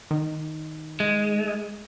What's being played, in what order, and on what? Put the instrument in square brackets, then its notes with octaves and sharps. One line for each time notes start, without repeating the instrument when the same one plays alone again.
[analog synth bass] D#3
[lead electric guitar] G#3